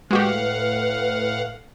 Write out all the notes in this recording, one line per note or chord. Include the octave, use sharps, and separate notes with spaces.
A2 G#3 F#4 G4 B4 F5 F#5